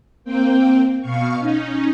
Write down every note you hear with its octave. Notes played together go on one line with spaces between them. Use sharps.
A#3 C4 G5
B2 F5 C#6
C#4 D#4